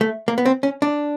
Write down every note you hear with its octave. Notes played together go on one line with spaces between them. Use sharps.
A3
A#3
B3
C4
C#4
D4